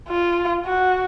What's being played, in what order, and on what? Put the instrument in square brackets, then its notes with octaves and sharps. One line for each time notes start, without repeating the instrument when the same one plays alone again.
[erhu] F4
F#4